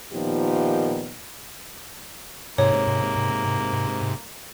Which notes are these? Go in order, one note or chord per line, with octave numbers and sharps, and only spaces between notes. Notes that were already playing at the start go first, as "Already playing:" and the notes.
A#2 D#3 F3 B3 D#4 G4
G#2 C3 A#3 C#5